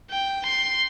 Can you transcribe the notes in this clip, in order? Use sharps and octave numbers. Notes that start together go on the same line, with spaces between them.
G5
C6